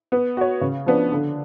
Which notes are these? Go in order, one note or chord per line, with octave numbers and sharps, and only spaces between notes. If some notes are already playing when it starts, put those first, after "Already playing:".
B3
F#4 C#5
C#3
F3 B3 D4
D3